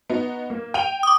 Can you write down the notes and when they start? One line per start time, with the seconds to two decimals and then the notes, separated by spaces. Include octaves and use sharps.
0.10 B3 D#4 F#4
0.50 A#3
0.74 G5 D#7 F7
1.03 D6 D#6